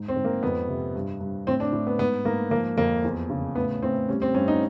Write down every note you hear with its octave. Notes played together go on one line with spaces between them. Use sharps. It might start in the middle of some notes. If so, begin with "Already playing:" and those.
Already playing: G#2
C4
G#2
A#3
F2 B3
C3
G2
G2
A2 C4
D4
A2
B3
G#2 B3
G#2 A#3
F3 A#3
F2 A#3
E2
C#3
A2 B3
A2 C4
G3 C#4
C4
G2 C#4
D#4